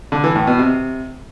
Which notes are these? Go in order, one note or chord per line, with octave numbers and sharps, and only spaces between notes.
D3
E3
A2
B2
C3